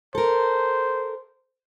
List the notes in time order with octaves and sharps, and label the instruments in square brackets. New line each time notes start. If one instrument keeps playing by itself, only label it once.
[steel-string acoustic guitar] A4 A#4 [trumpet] C5